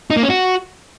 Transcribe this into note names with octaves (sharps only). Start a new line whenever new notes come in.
D#4
A#3
C#4
F#4